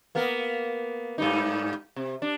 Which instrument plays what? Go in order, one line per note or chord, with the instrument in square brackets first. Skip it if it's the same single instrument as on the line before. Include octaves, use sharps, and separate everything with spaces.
[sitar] A#3 B3 A#4
G#2 G3 D#4
C3
D4